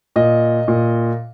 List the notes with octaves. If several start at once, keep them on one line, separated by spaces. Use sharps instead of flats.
A#2 D#5
A#2